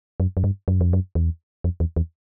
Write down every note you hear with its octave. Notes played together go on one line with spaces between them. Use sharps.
F#2
F#2
G2
F#2
F2
F#2
E2
F2
E2
E2